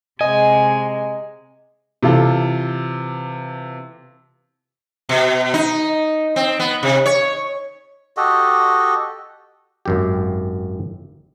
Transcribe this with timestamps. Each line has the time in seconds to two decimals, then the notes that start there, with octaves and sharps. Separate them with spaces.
0.21 C3 G#3 D#5 G#5
2.03 C3 E3 F4 A4
5.09 B2
5.54 D#4
6.36 C4
6.60 B3
6.83 C3
7.06 C#5
8.17 F#4 G4 A4 D#5
9.86 G#1 F#2 G4